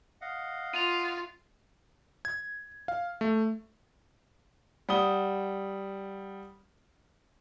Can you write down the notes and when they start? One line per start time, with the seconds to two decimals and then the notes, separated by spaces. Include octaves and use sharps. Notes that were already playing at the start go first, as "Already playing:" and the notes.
0.21 D#5 F5 F#5
0.74 F4 D#7 F7
2.25 G#6
2.88 F5
3.21 A3
4.89 G3 F#5 D#6 G7